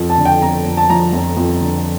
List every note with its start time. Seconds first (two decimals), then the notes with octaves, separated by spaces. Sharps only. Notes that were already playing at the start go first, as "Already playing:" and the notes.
Already playing: F2
0.10 A5
0.18 D3
0.25 G5
0.41 F2 A#5
0.65 F2
0.77 A5
0.90 F3 A#5
1.13 F2
1.37 F2
1.61 D3